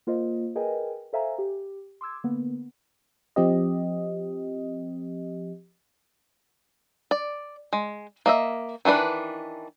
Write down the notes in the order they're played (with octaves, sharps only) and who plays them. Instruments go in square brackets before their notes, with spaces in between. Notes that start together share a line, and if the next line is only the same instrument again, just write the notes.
[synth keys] A#3 F4 C5 D#5
G#4 A#4 B4 D#5 G5 G#5
A4 C5 E5 F5 G#5 A#5
G4
C6 D6 E6 G#6
D3 A#3 B3
[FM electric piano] F3 C4 G4 D#5
[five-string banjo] D5
G#3
A#3 D#5 E5
D#3 E3 D4 B4